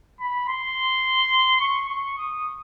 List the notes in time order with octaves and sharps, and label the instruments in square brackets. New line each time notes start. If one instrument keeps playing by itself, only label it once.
[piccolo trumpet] B5
C6
C#6
C#6
D#6